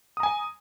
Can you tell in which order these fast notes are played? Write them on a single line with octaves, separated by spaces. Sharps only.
D#6 A#5 G#5